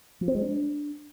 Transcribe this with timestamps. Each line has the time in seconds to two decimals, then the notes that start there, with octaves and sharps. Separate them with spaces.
0.21 F3
0.28 C4
0.35 G#3
0.42 D4